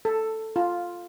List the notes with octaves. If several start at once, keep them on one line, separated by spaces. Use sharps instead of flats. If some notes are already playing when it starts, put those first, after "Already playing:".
A4
F4